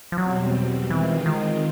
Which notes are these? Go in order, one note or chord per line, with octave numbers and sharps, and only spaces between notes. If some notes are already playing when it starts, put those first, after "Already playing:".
F3
E2 B2 F#3 G3 C4
D#3 E3 G#3 C4 F4
D#3